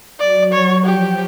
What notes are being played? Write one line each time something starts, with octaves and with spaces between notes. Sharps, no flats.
F#3 D5
C#5
F3 G4